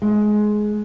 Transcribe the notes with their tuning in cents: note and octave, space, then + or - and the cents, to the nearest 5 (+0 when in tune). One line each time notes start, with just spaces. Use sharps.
G#3 +15